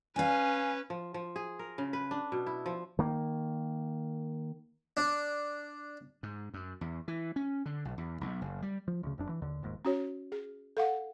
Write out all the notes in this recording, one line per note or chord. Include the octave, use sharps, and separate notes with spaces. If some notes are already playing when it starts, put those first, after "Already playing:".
C#4 B4 F5 G#5
F3
F3
G#4
A#4
C#3
B4
D4
B2
E4
F3
D#3 A#3
D4
G#2
F#2
E2
E3
C#4
D3
B1
E2
B1
F#1
G3
F3
D2 C#3
F1 F#2 D4
E3
D#2 D3
D#1 D#2 G#2
C#4 F#4 C#5
G#4
A4 F5 F#5